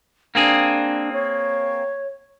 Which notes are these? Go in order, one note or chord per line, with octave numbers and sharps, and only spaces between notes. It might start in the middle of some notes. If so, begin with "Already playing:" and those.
A#3 C4 D4 G#4
C#5